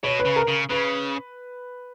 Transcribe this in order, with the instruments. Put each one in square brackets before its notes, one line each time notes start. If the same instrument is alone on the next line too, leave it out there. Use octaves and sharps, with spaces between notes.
[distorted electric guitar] B2 [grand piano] C#5
[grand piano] B4
[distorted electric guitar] C#3
[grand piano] A#4
[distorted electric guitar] C#3
[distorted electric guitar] C#3 [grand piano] B4